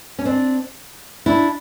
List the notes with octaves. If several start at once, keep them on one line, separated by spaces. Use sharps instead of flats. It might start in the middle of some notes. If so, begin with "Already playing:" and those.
C#4
C4 D4
D4 E4